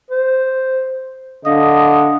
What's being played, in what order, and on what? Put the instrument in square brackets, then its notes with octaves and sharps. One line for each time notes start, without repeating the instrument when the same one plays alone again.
[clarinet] C5
[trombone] D3 [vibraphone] D4 F5 D#6 [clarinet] D#5